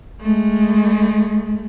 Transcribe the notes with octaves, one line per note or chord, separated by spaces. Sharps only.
G#3 A3